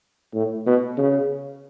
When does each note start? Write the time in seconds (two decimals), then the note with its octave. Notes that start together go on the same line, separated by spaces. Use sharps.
0.34 A2
0.66 B2
0.98 C#3